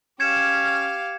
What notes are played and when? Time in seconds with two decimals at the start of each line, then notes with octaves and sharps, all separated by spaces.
0.20 C#4 G4 F5 G#6 C#7 E7